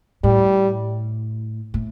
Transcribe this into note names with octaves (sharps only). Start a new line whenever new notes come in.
A2 G3
A2